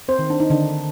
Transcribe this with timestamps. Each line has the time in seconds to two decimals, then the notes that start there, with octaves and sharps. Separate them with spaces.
0.08 C4 C5
0.19 D#3
0.30 D4
0.40 D#4
0.50 D3 D#3 D4